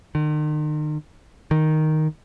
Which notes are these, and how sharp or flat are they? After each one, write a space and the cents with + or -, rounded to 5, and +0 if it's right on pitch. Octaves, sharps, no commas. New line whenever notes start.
D#3 -40
D#3 +0